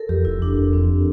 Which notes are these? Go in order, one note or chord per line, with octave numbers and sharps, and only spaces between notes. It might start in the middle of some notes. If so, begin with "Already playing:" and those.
Already playing: A4 A#4
F2 G4
F1 E4
F1 D4
F1
F2 C4